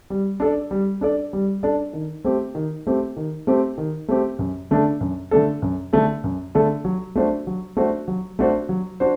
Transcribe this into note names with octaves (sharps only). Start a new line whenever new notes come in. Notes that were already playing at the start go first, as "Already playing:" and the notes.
G3
D4 A4 D5
G3
D4 A4 D5
G3
D4 A4 D5
D#3
A3 C4 G4
D#3
A3 C4 G4
D#3
A3 C4 G4
D#3
A3 C4 G4
F#2
D3 A3 D4 A4
F#2
D3 A3 D4 A4
F#2
D3 A3 D4 A4
F#2
D3 A3 D4 A4
F#3
A3 D4 F#4 C5
F#3
A3 D4 F#4 C5
F#3
A3 D4 F#4 C5
F#3
D4 F#4 C5